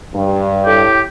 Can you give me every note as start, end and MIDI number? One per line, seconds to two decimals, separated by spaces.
0.14 0.83 43
0.66 1.01 45
0.66 1.01 67